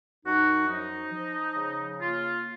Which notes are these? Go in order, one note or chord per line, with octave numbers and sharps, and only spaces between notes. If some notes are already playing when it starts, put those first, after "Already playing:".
F#2 D#4 F#4
F3 D#4
F3
C#3
A#3 F4